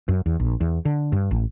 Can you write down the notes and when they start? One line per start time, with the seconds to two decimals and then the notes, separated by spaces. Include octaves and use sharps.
0.08 F#2
0.26 E2
0.40 A#1
0.61 E2
0.85 D3
1.12 G2
1.31 A1